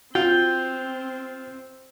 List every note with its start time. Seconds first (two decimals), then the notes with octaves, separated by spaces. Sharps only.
0.15 C4 F4 F#4 G5